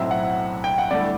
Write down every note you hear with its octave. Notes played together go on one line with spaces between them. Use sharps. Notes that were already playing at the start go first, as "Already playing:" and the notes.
Already playing: B1 A2 F#3 C4 E5
F#5
G5
F#5
G2 D3 A3 E4 D5